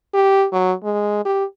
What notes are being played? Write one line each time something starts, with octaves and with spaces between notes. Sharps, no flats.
G4
F#3
G#3
G4